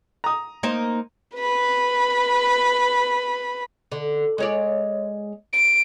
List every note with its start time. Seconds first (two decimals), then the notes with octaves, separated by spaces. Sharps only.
0.24 A#5 D#6
0.63 A#3 D#4 C5
1.35 B4 B5
3.92 D3
4.38 G#3 C#5 D5
5.53 D7